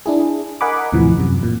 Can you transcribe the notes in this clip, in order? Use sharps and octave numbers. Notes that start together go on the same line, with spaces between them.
D4 E4 G#4
A#4 D#5 F#5 G#5 B5 D6
D#2 A2 C3 E3 F3
F#2 C3
A#2